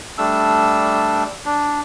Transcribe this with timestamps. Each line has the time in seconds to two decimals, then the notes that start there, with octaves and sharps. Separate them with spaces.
0.18 G3 A3 D4 E6
1.45 D4